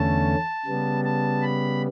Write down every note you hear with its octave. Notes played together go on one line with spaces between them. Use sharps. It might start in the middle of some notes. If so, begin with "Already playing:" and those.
Already playing: E2 D3 A3 C#4 A5
C#3 G3 B3
A5
B5